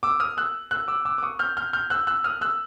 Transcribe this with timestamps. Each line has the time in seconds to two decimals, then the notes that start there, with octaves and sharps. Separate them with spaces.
0.03 D6 E6
0.20 D#6 F6
0.37 E6 F#6
0.71 E6 F#6
0.88 D6 E6
1.05 D6 E6
1.18 D6
1.23 C#6 D#6
1.39 F6 G6
1.57 F6 G6
1.73 F6 G6
1.90 E6 F#6
2.07 E6 F#6
2.24 D#6 F6
2.41 E6 F#6